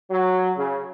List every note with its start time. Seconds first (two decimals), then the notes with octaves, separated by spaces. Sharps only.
0.11 F#3
0.58 C#3